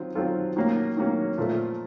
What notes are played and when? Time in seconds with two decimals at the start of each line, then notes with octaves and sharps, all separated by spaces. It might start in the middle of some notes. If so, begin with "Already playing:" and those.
Already playing: D#3 F#3 C4 F4
0.15 D#3 F#3 C4 F4 A4
0.56 D#3 F#3 A#3 C#4
0.97 D#3 F#3 A#3 C#4
1.38 A#2 F3 A3